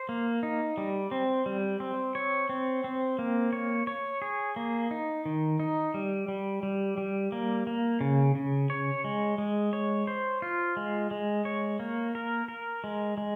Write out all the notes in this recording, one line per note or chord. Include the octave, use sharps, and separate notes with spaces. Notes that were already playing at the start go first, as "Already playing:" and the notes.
Already playing: C5
A#3
D#4
G3
C4
G3
C4
C#5
C4
C4
A#3
C#5
C#5
G#4
A#3
D#4
D#3
D#4
G3
G3
G3
G3
A#3
A#3
C#3
C#3
C#5
G#3
G#3
C#5
C5
F4
G#3
G#3
C#5
A#3
A#4
A#4
G#3
G#3